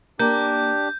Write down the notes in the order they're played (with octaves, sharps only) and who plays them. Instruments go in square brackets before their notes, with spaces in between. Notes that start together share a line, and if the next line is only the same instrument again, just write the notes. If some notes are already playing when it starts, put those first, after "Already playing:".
[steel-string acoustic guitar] A#3 [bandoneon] D4 G4 [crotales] G6